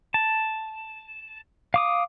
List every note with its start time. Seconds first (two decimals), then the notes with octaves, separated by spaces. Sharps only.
0.14 A5
1.74 F5 D6 D#6